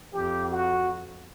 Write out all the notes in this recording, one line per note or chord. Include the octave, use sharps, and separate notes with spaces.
F2 G4
F#4